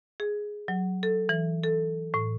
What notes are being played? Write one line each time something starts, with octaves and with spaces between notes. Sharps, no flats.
G#4
F#3
A4
E3
A4
A2